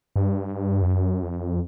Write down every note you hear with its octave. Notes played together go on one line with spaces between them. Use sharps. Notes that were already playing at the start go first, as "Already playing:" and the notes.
G2
F2
F#2
F2